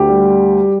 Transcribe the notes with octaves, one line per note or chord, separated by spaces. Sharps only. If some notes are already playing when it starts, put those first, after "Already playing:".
Already playing: D2 G4
G3